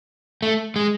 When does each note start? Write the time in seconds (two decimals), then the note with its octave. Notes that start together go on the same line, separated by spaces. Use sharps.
0.42 A3
0.76 G#3